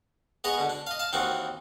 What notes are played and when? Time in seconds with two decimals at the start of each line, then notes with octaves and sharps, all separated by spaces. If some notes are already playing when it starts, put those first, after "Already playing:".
0.44 B3 G#4 C#5 D#5 A#5
0.58 B2 D3
0.69 D4
0.87 D#5 F5
0.99 F5 A5
1.13 D#2 E3 C4 D#4 F#4